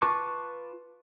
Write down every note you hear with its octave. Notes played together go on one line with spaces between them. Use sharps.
F4 B4 A5 C#6 D6